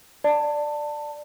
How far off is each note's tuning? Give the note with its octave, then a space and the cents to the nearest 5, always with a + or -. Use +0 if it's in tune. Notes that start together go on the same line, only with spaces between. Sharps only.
D5 +10 A5 +20